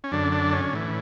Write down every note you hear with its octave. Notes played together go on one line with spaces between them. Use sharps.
C#4
F#2 D3 D4
D4
C#4
A2 E3